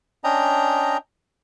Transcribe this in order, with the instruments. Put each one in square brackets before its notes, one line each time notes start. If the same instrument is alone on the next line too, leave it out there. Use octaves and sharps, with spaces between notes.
[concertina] C#4 D4 D#5 G5 A#5